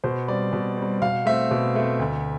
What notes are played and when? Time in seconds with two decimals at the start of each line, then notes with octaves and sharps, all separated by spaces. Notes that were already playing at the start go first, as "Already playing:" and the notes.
0.04 B2 C5
0.28 G3 C4 D5
0.53 B2
0.77 C4
0.82 G3
1.02 B2 F5
1.26 A3 C4 E5
1.51 B2
1.75 A3 C4
1.99 D2